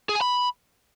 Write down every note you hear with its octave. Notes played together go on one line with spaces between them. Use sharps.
G#4
G#5
B5